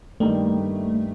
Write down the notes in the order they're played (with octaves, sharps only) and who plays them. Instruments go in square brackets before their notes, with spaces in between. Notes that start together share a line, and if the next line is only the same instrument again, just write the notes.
[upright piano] G2 D#3 G3 A#3 D#4 [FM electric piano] A3